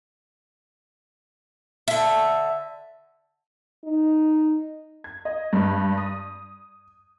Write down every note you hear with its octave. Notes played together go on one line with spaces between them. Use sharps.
D3 E5
D#4
G#6
D#5
G2
D#6